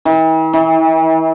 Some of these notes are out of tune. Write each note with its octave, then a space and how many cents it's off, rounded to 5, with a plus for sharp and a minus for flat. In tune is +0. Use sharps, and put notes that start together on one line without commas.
E3 -45
E3 -30